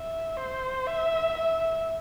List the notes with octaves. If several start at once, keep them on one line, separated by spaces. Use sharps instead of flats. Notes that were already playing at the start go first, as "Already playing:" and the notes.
Already playing: E5
C5
E5
E5